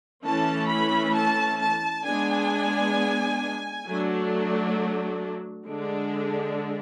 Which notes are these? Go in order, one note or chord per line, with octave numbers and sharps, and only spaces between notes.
E3 A3 C#4 A5
B5
A5
A5
G#3 B3 D4 G#5
F#3 A3 D4
D3 G#3 D4